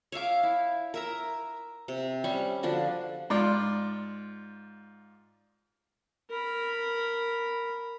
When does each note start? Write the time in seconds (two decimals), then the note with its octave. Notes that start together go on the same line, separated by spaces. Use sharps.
0.12 C#5 E5 F5 D6
0.43 E4
0.94 A#4 E5 A#5
1.88 C3
2.24 G3 C#4 C#6
2.63 D3 F3 D4 F#4
3.30 G#2 F4 D5
6.30 A#4 B5